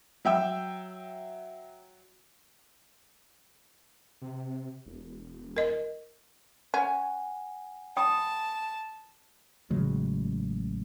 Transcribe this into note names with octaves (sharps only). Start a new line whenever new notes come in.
F#3 E5 G5 E6
C3
E1
A#4 D#5
C#4 F#5 G#5
G5 A5 B5 D#6
A1 C#3 F#3 G#3